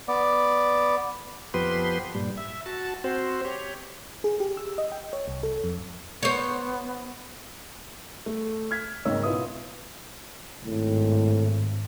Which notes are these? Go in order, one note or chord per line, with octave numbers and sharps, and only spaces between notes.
B3 D5
F2 F3 B3 G4 B4 C6
G2 A#2 G3
E5
F#4 A5
C4 F#4 C5
G4 C#5
G#4
G4
E6
D#5
G5
C#5
C2
A4
F2
B3 C5 C#5
A3
F6 G#6 B6
G#1 D#2 C#3 D#4 C#5 E6
B2 E4 F4 B4 E5 D#6
G#1 A2